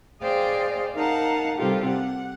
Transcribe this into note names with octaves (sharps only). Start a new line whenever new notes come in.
G#4 C5 D5 D#5 F5 G5
D#4 A#4 F5 F#5 A5
C3 G3 C4 F4 G4 A4
F#5